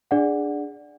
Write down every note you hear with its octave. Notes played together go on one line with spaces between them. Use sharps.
D4 G#4 D5 F#5